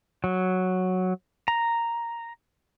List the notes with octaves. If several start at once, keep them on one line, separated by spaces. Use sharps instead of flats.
F#3
A#5